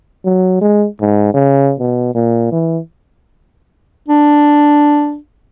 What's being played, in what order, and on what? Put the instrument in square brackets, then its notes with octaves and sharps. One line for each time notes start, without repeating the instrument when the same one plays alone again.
[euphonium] F#3
G#3
G#2
C#3
B2
A#2
E3
[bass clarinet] D4